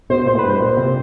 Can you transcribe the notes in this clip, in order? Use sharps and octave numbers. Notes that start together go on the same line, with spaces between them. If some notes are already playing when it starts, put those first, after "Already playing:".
B2 C5
A#2 C5
A2
B4
G2
C5
A#2
C3